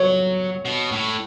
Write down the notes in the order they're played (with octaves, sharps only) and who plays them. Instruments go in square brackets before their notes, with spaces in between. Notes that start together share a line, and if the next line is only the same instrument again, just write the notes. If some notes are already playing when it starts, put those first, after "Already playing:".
Already playing: [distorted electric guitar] F#3 [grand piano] C#5
[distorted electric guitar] B2
A2